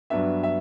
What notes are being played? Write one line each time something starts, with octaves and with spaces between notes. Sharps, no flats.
G2 F#3 B3 D4 E5
E5